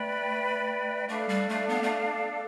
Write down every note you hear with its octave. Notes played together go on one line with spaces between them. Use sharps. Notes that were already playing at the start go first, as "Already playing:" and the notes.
Already playing: A3 B4 D5 G5 B5
A3 D4 A4 D5 F5
G3
A3
B3
A3